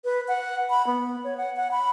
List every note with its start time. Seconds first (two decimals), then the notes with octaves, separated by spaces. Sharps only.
0.05 B4
0.28 F#5
0.70 B5
0.87 B3
1.24 C#5
1.37 F#5
1.56 F#5
1.71 B5